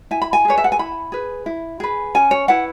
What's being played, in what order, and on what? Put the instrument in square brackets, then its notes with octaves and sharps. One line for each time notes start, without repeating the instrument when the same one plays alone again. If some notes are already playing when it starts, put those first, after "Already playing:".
[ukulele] E4 G#5
B5
G#5
G#4 B4 C#5
E5
F#5
G#5
E4 B5
G#4 B4
E4
G#4 B4
C#4 G#5
C#5
E4 B4 F#5